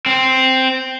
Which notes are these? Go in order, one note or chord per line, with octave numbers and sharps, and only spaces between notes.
C4